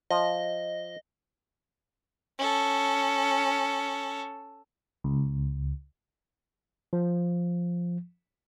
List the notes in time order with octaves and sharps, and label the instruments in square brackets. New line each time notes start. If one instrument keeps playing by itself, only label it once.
[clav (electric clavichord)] F3 [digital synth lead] D#5
[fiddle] C#4 A4
[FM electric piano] C#2
[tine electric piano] F3